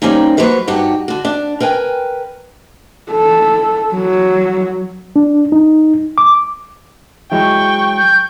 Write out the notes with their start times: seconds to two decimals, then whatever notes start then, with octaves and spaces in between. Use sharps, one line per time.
0.02 G3 A#3 C4 C#4 D#4
0.37 F#3 A3 A#3 F#4 B4 C5
0.68 G2 D#4 F#4 G4
1.08 D3 F#4
1.25 D4
1.60 A#4 B4 G5 G#5
3.12 A4
3.95 F#3
5.16 D4
5.52 D#4
6.18 D6
7.32 F#3 G#3 E4 G5 C#6
7.98 G6